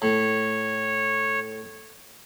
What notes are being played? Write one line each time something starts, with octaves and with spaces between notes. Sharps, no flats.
A2 C#5